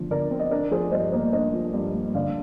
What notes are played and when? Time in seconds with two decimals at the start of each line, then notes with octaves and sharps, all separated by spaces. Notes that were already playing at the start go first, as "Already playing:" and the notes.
Already playing: D3 F3
0.11 D3 A#4 D5
0.31 C4
0.40 D#5
0.51 D4 A#4 D5
0.71 F3 G#4 C5
0.92 G2 C5 D#5
1.12 A#3 C5 D#5
1.33 D4 C5 D#5
1.54 F3
1.74 G2
1.95 A#3
2.15 D3 D5 F5